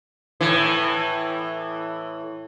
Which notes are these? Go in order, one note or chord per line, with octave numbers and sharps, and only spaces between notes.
A2 E3